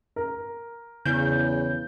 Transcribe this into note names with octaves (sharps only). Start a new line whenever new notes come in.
A#4
E2 C#3 G6